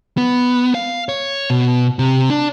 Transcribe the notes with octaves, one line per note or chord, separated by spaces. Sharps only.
B3
F5
C#5
B2
C3
D4